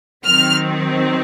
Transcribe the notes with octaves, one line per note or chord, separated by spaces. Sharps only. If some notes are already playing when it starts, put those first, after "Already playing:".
D#3 F#3 C4 F6